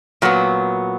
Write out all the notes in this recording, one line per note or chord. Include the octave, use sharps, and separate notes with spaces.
A#2 F#3 B3